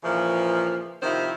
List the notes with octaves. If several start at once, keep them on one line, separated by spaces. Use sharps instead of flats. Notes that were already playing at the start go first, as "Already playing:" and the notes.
A#2 C#3 E3 F3
C3 D#3 F3 D#4 E4 C5